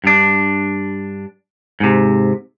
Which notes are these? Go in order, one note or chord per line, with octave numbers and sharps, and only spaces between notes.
G2 D4
G#2 C3